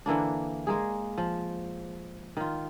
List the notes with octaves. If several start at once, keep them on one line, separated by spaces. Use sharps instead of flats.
D3 E3 A#3 D4
G#3 A#3 G#4
F3
D#3 F4